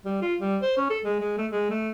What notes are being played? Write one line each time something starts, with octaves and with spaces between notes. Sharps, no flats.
G3
F4
G3
C5
C#4
A4
G#3
G#3
A3
G#3
A3